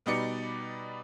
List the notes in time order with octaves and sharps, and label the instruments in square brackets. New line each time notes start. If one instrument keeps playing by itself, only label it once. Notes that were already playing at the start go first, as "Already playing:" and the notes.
[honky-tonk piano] B2 G3 B3 D#4 D5 C#7